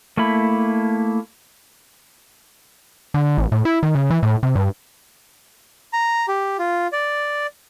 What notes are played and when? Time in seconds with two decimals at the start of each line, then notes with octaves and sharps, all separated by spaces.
0.17 A3 A#3 E4 B5
3.14 D3
3.38 A1
3.52 A2
3.65 E4
3.83 D#3
3.95 C#3
4.10 E3
4.23 A2
4.43 C3
4.55 G2
5.93 A#5
6.28 G4
6.59 F4
6.92 D5